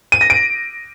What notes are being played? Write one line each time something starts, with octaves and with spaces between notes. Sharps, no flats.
D#7
A#6
D7